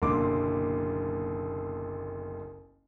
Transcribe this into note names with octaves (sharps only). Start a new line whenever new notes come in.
F#1 B1 D3 A#3 C6 D6